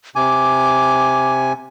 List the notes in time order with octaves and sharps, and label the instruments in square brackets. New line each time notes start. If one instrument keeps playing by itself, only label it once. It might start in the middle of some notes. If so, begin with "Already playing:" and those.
[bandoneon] C3 G#5 [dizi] D6